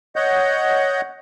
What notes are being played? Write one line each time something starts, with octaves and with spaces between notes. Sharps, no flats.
C#5 D#5 F#5 G6